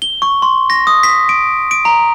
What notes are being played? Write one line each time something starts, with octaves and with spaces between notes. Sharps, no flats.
G7
C#6
C6
A#6
D#6
B6
D7
D7
A#5